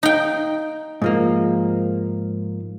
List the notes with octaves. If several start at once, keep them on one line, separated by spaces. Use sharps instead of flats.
D#4 G5
G#2 F3 A#3